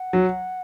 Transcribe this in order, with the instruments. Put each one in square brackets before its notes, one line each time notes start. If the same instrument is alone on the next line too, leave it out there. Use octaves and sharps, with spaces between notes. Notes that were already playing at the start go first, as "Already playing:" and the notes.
Already playing: [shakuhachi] F#5
[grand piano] F#3